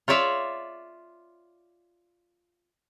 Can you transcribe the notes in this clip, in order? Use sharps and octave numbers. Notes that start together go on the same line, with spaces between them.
F4 C#5 D5 E5 F5